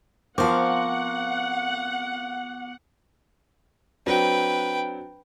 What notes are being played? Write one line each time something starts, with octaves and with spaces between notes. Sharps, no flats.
F3 B3 C4 A#4 F5 F#5 C#6 D6
F#3 C4 D4 B4 G5